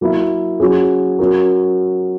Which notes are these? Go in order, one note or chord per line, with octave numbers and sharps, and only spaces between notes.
F#3 A#3 E4 A#4
F#3 C#4 G#4
F#3 C#4 F#4 A#4